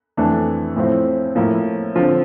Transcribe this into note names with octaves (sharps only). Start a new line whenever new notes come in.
F2 E3 A3 D4
A2 F3 C4 E4
A2 F3 A#3 E4
D3 F3 C4 F4